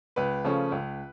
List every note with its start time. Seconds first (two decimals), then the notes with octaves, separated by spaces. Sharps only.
0.16 C#2 B4
0.44 C#3 F3 A3 C#4
0.72 C#2